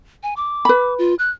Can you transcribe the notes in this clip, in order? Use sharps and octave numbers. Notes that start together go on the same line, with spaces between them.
G#5
D6
B4 B5
F4
F#6